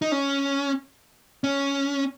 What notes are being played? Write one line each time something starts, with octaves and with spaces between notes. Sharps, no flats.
D#4
C#4
C#4